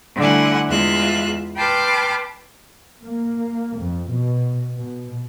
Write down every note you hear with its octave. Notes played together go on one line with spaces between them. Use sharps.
D3 G3 A3 E4 F#5 G#5
E2 G#3 F4 E5 F#6
B4 G5 A5 C6 D6 F6
A#3
F2
B2
B2